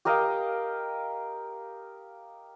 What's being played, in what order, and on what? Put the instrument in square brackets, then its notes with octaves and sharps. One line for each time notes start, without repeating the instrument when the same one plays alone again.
[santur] G4 A#4 D#5 F5